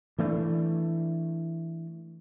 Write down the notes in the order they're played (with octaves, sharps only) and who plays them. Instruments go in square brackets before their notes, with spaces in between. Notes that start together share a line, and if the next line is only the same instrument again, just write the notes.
[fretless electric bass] E3 A3 D4